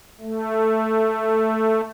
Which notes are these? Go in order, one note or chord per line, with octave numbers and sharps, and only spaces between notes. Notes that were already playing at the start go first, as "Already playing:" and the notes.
A3